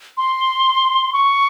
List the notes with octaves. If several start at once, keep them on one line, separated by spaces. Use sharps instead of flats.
C6
C#6